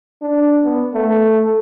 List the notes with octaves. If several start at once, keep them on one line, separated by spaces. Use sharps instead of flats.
D4
B3
A3